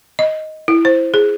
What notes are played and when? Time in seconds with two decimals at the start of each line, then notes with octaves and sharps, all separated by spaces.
0.19 D#5
0.68 E4
0.85 C5
1.14 G#4